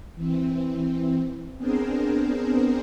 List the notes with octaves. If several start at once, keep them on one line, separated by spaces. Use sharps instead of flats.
E3 C4
B3 C4 D4 G#4 A#4 C5